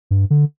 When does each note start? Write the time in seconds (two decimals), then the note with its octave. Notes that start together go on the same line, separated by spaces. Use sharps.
0.11 G2
0.30 D3